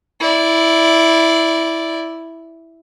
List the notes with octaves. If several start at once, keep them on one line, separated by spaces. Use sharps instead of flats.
E4 D5